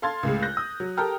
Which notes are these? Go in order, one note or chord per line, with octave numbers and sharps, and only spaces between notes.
A4 F5 C6 F6 G#6 A6
C#2 A2 G#3
F#6 G6 A#6
D#6
F#3
G4 A4 A#4 G5 A#5 F6